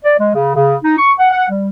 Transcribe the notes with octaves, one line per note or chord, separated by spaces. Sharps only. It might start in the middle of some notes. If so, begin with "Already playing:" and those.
D5
G#3
C#3
C#3
D#4
C#6
F#5
F#5
G3